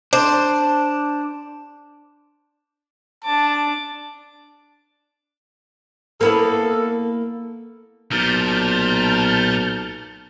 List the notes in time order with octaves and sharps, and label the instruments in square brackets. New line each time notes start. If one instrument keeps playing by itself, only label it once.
[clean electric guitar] D4 [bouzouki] C5
[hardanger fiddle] D4 D6 [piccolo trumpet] A5
[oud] A#3 B3 E4 [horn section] A4
[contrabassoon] B1 [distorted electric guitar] A#2 [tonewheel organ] A5 F6 G6